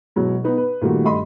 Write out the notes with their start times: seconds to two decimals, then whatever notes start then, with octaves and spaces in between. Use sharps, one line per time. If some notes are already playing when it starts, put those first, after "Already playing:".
0.16 B2 E3 F#3 G#3
0.44 B3 D#4 B4
0.57 B4
0.82 A#2 D#3 G3 A3 F#4
1.04 G2 A3 D#5 B5 C6